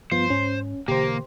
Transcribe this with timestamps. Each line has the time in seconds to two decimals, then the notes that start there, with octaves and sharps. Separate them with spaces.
0.12 G2 F3 B3 F4 C5
0.30 G#2 C#4
0.88 B2 D3 E3 A#3 G4 C5